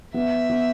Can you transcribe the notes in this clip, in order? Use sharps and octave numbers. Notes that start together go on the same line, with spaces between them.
B3 E5
B3